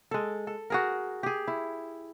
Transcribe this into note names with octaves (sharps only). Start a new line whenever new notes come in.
G#3 A4
A4
F#4 G#4 A#4
G4 G#4
E4